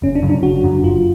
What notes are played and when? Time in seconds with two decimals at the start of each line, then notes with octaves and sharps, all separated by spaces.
0.02 F#1 C#4
0.15 D4
0.22 F#2 C#3 F#3
0.30 D4
0.43 F#1 F#4
0.63 F#2 C#3 F#3
0.84 F#1 F4